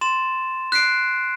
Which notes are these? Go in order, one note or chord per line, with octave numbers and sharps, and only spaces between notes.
C6 A6 E7
F#6 B6 C7 D7